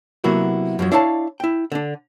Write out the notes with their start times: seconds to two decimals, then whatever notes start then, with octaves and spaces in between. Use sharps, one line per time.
0.24 C3 F#3 A#3 B3 E4 F#4
0.79 F#2 F3 F#3
0.92 D4 E4 C#5 F5 F#5 A5
1.40 E4 G5
1.72 D3 D4